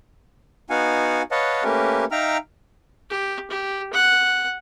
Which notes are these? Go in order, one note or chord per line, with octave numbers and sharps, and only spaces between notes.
B3 D#4 F#4 F5 F#5 G#5
B4 C#5 D#5 F5 F#5 A5
A3 A#3 C#4 G4 A#4 B4
D#4 E5 F5 G5 A#5 F6
G4
G4
F#5